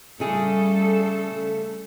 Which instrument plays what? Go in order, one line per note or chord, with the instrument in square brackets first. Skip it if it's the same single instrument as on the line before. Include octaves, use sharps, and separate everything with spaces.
[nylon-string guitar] C#3 G#4 [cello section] G3 A4 [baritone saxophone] A3